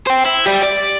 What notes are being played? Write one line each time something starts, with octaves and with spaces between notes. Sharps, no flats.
C5 G5
E4
G4 D5
D5